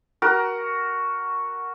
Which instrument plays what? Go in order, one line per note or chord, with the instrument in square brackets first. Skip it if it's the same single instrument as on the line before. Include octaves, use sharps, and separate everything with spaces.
[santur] F#4 A#4